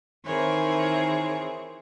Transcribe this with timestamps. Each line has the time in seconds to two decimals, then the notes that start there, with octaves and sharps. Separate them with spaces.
0.25 D#3 E3 C4 G#4 A#4 C#5